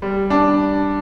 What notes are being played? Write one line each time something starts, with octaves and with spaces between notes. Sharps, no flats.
G3
D4